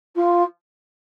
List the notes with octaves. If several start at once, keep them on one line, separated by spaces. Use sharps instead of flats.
F4